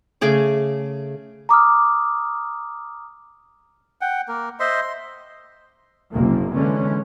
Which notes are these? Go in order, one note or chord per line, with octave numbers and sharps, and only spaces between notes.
C#3 A3 G#4 D6
A#5 D6 D#6 F6
F#5 G5
A#3 A#4
C5 D#5 E5 C6
C6
F#1 C2 F#2 A#3
D3 E3 G#3 C#4